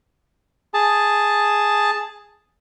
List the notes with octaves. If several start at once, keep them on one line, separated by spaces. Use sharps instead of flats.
G#4 A5